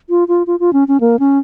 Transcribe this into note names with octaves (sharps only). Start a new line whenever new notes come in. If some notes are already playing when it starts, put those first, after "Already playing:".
F4
F4
F4
F4
C#4
C#4
A#3
C#4